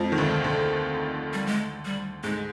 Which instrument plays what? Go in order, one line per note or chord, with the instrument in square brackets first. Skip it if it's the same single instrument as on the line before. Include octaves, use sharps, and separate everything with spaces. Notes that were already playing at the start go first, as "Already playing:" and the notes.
Already playing: [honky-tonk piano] F2 F3 [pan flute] G#3
[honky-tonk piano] D#3
D2 D3
D2 D3
[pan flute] G3
G#3
G3
[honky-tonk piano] G#2 [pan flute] G#3